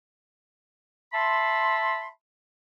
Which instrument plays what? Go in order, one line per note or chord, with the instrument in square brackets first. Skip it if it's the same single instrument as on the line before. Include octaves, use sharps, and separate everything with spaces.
[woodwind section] E5 A5 B5 C6